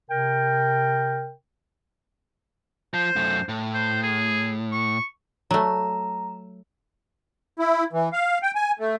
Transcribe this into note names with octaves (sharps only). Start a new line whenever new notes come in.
C3 A#4 G5
F3 C5
F#2 A3
A2
C5
G#4
C#6
F#3 A3 A#5
E4
E3
F5
G5
G#5
A3